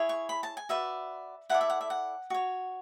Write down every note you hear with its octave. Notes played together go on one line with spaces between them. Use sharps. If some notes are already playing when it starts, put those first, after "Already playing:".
Already playing: E4 G#4 C#5
C#6
B5
A5
G#5
F#4 B4 D5 E5
E4 A4 D5 F#5
E5
F#5
E5
F#5
F#4 C#5